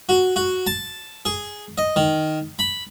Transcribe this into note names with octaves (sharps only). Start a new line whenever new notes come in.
F#4
F#4
A5
G#4
D#5
D#3
B5